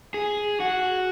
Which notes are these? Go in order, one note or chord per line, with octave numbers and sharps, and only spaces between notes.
G#4
F#4